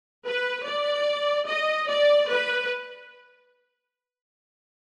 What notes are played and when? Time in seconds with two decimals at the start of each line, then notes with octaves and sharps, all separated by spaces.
0.25 B4
0.65 D5
1.47 D#5
1.89 D5
2.30 B4